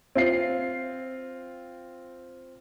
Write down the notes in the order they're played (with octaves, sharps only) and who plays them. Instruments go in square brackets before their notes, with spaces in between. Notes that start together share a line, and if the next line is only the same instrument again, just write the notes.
[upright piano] C4 F4 C7